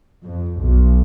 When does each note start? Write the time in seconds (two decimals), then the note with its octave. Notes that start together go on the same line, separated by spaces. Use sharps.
0.25 F2
0.60 B1